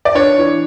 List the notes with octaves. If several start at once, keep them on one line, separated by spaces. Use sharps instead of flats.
D5
D4 C#5
E3